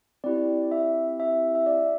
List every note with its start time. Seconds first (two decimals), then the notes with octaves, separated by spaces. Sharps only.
0.24 C4 E4 G4 D5
0.72 E5
1.20 E5
1.55 E5
1.66 D5